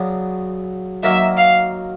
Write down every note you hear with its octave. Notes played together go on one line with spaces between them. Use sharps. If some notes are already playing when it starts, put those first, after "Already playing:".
Already playing: C#3 F#3 B3 D4
D#3 F#3 A#3 E5
F5